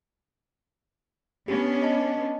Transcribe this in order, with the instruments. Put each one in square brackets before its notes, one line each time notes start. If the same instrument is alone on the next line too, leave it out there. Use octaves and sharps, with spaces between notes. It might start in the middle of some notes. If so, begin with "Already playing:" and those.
[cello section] B3 C#4 D4 [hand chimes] G4
[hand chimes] D#5 A5